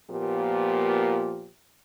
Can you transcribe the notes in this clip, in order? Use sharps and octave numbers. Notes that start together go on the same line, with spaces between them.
A#2 F3 A#3 B3 G4